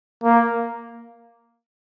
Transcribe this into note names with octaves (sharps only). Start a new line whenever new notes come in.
A#3